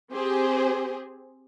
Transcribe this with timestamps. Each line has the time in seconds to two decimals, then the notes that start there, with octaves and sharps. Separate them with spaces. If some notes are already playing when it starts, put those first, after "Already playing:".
0.12 C4 G4 G#4 C5